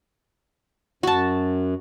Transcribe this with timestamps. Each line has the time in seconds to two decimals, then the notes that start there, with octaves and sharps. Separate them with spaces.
1.03 F#2 F#4 A5